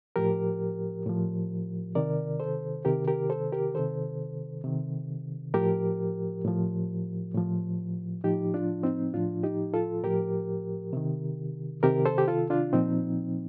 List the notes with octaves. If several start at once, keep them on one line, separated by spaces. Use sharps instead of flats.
A2 F3 G4 A#4
A2 F3
C3 D#3 A#4 D5
A4 C5
C3 D#3 G4 A#4
G4 A#4
A4 C5
G4 A#4
C3 D#3 A4 C5
C3 D#3
A2 F3 G4 A#4
A2 F3
A2 F3
A2 F3 D#4 G4
D4 F4
C4 D#4
A2 F3 D4 F4
D#4 G4
F4 A4
A2 F3 G4 A#4
C3 D#3
C3 D#3 G4 A#4
A4 C5
G4
F4 A4
D4 F4
A#2 F3 C4 D#4